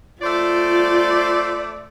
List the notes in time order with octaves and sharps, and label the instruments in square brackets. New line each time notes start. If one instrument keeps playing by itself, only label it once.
[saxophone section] A3 C5 D5 [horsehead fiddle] F4